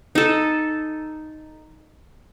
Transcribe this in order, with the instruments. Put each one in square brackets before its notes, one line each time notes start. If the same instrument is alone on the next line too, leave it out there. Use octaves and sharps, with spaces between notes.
[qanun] D#4 A4